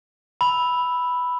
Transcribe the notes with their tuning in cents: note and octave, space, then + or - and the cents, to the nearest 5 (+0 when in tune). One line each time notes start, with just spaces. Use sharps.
B5 +0 E6 -5